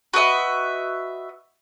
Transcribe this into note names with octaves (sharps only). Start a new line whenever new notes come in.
F#4 B4 D#5 E5